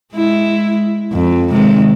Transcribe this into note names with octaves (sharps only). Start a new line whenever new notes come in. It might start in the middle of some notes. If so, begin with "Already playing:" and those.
G#3 E4
F2
C3 D#3 G#3